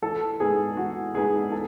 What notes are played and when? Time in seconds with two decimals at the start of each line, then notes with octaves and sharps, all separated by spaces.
0.02 E3 A4
0.40 G#3 B3 D#4 G#4
0.77 E3 F#4
1.14 G#3 B3 D#4 G#4
1.52 E3 A4